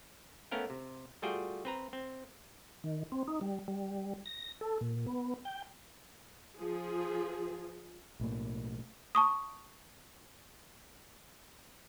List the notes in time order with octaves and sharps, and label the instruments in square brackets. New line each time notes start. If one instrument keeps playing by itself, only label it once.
[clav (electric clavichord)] A3 B3 C#4 A#4 F5 G5
C3
G3 A3 F4 F#4 G#4 G5
C4 B4 A#5
C4
[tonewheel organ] D#3
C4
D#4
G3
G3
A#6
A4
A#2
B3
G5
[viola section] F3 G#4
[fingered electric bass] B1 A2 A#3
[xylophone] A5 C#6 D#6